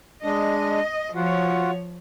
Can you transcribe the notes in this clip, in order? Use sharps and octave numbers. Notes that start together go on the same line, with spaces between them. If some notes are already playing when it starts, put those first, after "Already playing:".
G#3 D4 D#5
F3 F4 F#4 C#5 F#5